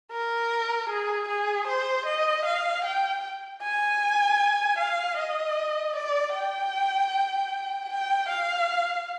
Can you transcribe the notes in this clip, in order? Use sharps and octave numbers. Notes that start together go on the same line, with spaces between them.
A#4
G#4
G#4
C5
D#5
F5
G5
G#5
F5
D#5
D5
G5
G5
F5